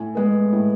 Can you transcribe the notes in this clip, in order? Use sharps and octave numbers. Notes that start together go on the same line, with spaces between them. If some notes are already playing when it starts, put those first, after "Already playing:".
Already playing: A2 G#5
G#3 B3
A2